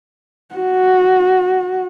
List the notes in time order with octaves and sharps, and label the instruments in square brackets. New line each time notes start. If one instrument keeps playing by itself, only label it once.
[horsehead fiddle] F#4